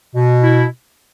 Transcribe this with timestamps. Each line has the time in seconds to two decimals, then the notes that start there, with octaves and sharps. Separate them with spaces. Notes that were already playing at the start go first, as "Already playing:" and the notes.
0.15 B2
0.43 E4